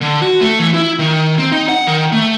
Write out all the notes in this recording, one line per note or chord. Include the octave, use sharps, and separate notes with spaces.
D3
F#4
A3
E3
E4
D#3
C4
D#4
F#5
D#3
A3